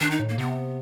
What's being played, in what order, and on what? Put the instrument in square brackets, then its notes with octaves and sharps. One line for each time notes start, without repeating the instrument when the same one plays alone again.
[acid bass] D#3 [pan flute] D4
[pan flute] D#4
[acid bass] A2
[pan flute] A#3
[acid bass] C3 [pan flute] B3